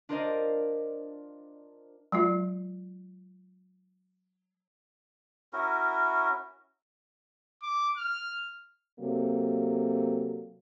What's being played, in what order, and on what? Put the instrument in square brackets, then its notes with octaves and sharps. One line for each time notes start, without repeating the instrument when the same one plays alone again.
[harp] D4 F4 A#4 C5 D5 D#5
[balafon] F#3 G#3 F4
[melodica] C#4 E4 F#4 A#4
[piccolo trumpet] D6
F6
[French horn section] C3 F#3 A#3 A4